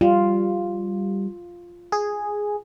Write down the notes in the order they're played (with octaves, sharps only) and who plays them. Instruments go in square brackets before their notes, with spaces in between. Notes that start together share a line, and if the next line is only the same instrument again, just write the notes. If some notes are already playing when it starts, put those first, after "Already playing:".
[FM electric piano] G3 [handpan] F4
[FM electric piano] G#4